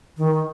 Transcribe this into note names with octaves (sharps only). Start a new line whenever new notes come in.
D#3